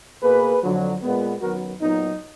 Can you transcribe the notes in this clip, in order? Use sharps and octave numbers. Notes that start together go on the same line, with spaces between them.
B2 A#3 G#4 B4
F2 D3 F#3
A#2 G#3 B3
F#2 D#3 F#3 B3 F#4 A#4
A#2 F#3 B3 D#4